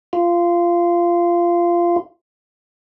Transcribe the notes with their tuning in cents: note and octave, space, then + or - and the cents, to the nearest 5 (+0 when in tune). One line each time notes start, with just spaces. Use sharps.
F4 -15